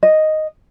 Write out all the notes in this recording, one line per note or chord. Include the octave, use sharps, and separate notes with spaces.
D#5